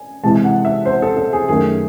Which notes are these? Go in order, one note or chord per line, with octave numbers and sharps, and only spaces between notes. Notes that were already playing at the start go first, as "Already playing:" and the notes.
Already playing: G#5
C3 E3 G#3 A5
F#5
E5
C5
A4
A4
G#4
F#2 D#3 A3 G#4